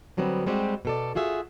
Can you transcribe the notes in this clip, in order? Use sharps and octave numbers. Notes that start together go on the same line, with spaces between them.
D3 F#3 G3 B3 C4
G3 G#3 C4 F#4 G4
B2 A4 D5
F4 F#4 G#4 E5